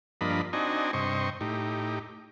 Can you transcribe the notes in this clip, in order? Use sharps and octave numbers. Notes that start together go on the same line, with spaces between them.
G2 F3 A#3 D4 D#5 B5
C4 D4 D#4 F#4 D#5 G#5
G2 C3 C5 D#5 C#6
A2 D#4 G4